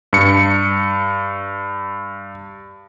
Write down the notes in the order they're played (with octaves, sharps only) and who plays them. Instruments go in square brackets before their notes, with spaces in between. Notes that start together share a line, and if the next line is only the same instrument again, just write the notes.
[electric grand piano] G2 C#7